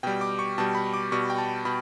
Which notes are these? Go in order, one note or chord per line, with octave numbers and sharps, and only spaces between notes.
B2 G3 G5
D6
C#6
B2 G3 A5
B5
D6
B2 G3 C#6
G5
A5
B2 B5